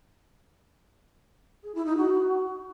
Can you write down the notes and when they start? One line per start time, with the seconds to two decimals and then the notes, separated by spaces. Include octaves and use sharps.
1.63 G#4
1.75 E4
1.86 D#4
1.97 F#4